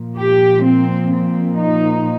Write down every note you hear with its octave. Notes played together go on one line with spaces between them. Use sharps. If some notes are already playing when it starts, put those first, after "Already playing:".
Already playing: A#2 F3
G4
C4
C4
D#4